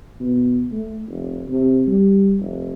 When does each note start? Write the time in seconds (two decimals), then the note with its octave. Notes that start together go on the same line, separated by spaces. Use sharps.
0.20 B2
0.72 A3
1.08 F1
1.47 C3
1.87 G3
2.39 F1